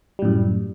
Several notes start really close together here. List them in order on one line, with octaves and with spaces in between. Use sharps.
G3 A2 F#2